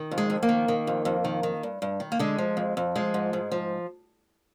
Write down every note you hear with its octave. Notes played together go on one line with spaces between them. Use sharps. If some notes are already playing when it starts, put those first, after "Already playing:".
Already playing: D#3
F2
G#3
F2
A#3
D#3
D#3
F2
F2
D#3
D#3
G2
G2
D#3
A#3
D3 G#3
F3
F2
F2
F3 G#3
G#2
G#2
F3